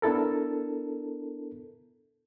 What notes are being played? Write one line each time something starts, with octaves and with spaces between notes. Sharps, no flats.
B3 D4 E4 A4 A#4